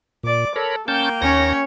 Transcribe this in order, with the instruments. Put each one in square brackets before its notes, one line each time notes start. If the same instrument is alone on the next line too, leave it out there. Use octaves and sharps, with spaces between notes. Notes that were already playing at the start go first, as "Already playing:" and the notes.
[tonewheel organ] A#2 [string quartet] D5 D6
[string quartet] A4 [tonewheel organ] A#4 C#5 B5
[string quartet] A#3 G5 [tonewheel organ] C#4 A5 G6
[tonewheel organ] D#2 A#6 [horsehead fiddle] C#4 C#5